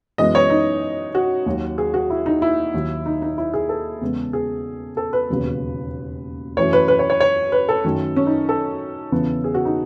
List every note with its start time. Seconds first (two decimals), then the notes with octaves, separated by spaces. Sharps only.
0.18 F#2 E3 G#3 B3 D#5
0.35 C#5
0.50 D#4
1.15 F#4
1.46 D#2 D#3 F#3
1.78 G#4
1.94 F#4
2.10 E4
2.26 D#4
2.42 E4
2.74 D#2 D#3 F#3
3.06 D#4
3.22 D#4
3.38 E4
3.54 G#4
3.69 A4
4.01 E2 C#3 G#3 B3
4.33 G#4
4.97 A4
5.13 B4
5.29 E1 D#2 C#3 F#3 B3
6.57 F#2 E3 A3 C#5
6.73 B4
6.88 B4
6.99 C#5
7.10 C#5
7.20 C#5
7.52 B4
7.69 A4
7.84 F#2 D#3 A3
8.16 C#4
8.26 D#4
8.49 A4
9.12 E2 C#3 E3 B3
9.44 G#4
9.54 F#4
9.65 D#4